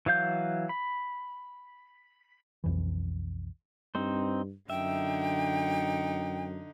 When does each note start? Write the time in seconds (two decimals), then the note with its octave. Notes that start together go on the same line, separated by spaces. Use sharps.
0.06 E3 F#3 F5 G6
0.69 B5
2.64 B1 F2 E3
3.95 G2 C4 D#4 C5
4.70 F#2 D3 D#4 E5 G5